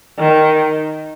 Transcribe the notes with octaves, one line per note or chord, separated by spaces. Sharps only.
D#3